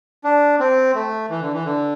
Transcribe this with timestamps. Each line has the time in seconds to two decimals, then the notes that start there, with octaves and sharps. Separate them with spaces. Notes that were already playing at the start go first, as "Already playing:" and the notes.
0.24 D4
0.60 C4
0.95 A3
1.30 E3
1.42 D3
1.53 E3
1.65 D3